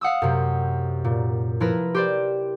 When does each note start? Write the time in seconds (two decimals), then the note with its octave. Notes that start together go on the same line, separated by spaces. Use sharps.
0.01 F5 F#5 D#6 E6
0.22 F#2 C3
1.05 A#2
1.60 F3 E4 A#4 B4 A#6
1.94 G4 C5 D5